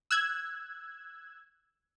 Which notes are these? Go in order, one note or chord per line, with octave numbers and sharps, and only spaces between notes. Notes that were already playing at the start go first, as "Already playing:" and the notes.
E6 F#6 G#6